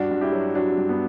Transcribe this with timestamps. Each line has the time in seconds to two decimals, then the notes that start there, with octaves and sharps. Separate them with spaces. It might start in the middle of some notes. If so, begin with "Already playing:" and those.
Already playing: G2 D4 F#4
0.11 G2
0.21 E4 G4
0.33 F#3
0.55 F#3 D4 F#4
0.78 G2
0.89 B3